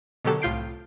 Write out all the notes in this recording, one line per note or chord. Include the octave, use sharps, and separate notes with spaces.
B2 D3 D#3 F#3 G4 A4
C2 A2 F4 G6 C7 D7